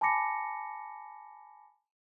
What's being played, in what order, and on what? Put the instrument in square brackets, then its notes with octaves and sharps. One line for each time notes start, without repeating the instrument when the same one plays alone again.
[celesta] G#5 A5 B5 D6 A#6 C#7